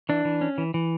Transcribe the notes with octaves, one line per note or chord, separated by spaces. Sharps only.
E3 D4
E3
C#4
E3
E3